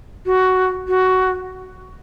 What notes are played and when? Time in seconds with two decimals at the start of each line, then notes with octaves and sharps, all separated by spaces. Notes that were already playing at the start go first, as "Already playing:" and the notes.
0.26 F#4
0.88 F#4